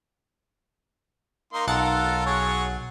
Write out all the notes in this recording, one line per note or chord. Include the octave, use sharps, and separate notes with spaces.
A#3 D#4 C6
B1 F4 A4 A#4 F#5 A6
F#3 G#4 C#5